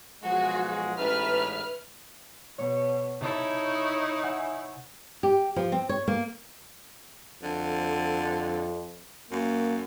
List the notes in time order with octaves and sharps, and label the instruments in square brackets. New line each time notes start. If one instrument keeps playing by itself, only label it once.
[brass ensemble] B1 F3 G#3 [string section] F#4 G#4
[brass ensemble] A1 G#2 [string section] B4 E5 F6
[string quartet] B2 [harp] C#5
[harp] C3 A4 [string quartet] D#4 E4 C#5
[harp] E5 F#5 G#5
[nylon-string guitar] G4
F3
C4
C#5
A#3
[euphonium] F2 [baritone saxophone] D3
[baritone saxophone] F#2 [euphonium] A#3